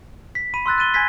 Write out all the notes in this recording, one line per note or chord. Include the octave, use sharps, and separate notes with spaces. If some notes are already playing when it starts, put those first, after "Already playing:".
B6
B5 D#7
C6 E6 F#6 A6
F#6 A6 D#7 G7
G#5 G6 G#6 A#6 B6